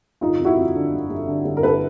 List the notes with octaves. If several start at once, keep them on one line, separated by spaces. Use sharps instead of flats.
G1 D#4 F4
F2
E4 F#4
F2
D3
G1
G1
D3
G1
A#4
G1 A4 B4